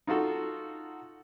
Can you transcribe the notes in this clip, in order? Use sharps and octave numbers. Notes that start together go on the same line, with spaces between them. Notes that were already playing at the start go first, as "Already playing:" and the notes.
D#4 F4 F#4 A4